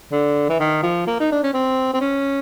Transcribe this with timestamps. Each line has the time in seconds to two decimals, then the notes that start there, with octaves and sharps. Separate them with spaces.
0.12 D3
0.49 E3
0.60 D#3
0.83 F3
1.07 A#3
1.20 D#4
1.32 D4
1.43 C#4
1.54 C4
1.94 C4
2.01 C#4